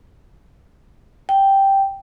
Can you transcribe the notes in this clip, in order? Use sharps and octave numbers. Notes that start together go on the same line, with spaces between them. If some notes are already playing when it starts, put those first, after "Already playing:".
G5